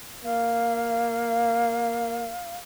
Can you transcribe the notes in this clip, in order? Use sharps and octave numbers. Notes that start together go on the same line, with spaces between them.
A#3 F5